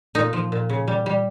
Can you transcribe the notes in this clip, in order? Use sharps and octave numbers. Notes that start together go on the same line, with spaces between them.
A#2 D#4
F3
A#2
C#3
G3
G3